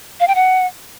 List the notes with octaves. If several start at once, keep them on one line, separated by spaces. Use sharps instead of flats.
F5
G5
F#5